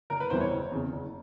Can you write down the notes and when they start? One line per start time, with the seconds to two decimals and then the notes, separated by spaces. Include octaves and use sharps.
0.10 F#1 A#4
0.20 B4
0.30 E2 C3 E3 G3 C5
0.40 C#5
0.51 F#1
0.71 E2 C#3
0.92 F#1